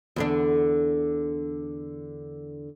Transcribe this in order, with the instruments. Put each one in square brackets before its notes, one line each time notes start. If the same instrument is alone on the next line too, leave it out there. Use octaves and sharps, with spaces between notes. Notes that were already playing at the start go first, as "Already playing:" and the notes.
[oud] E2 D3 D4